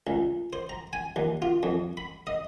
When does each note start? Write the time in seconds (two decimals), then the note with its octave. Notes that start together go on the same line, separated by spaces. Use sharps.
0.07 C#2
0.53 C5
0.69 A#5
0.93 G#5
1.16 D#2
1.42 F4
1.63 F2
1.97 B5
2.27 D#5